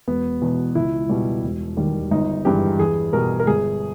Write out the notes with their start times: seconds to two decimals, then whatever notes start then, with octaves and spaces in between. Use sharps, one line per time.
0.08 E1 B3
0.41 E2 B2
0.75 C#2 E4
1.09 B2 G3
1.43 E1
1.77 D#2 D#3 G3
2.11 G1 D#4
2.45 G2 E3 G#3 G4
2.79 E2 G#4
3.13 B2 G3 A#4
3.40 A#4
3.47 G1 G#4